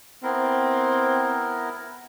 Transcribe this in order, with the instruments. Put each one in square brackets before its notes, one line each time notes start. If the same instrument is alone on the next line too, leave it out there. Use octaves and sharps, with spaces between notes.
[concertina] B3 E4 A#4 [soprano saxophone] C4